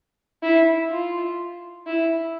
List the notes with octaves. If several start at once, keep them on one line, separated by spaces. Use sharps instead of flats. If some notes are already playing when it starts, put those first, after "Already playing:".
E4
F4
E4